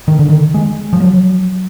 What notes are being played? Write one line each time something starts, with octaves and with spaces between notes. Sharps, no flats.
D#3
D3
D#3
G#3
F3
F#3